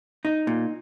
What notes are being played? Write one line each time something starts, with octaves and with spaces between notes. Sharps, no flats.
D#4
A#2